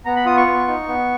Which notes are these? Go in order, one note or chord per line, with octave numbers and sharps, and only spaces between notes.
B3 A#5
B5
F4 D#6
C#6
B3
D#4
B3